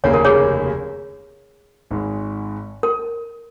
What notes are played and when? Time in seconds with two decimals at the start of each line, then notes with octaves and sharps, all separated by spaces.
0.04 F1 D#2 C#3 A#3 C#5
0.14 A#4
0.25 G#4 C#5
1.91 G#1 G#2 G#3
2.83 A#4